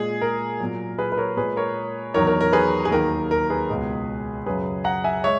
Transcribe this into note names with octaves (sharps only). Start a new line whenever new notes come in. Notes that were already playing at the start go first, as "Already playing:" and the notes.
Already playing: A#2 G#3 G#4
A#4
A#2 F#3
G#4 B4
B4
A#4 C#5
A#2 G#3 G#4 B4
A#4 C#5
E2 D#3 F#3 A#4 C#5
A#4
A#4
G#4 B4
G#4
D#2 D#3 F#3 A#4
A#4
G#4 B4
C#2 B2 G#3
F#2 C#3 F#3 G#4 B4
F#5 A#5
E5 G#5
G#3 C#5 E5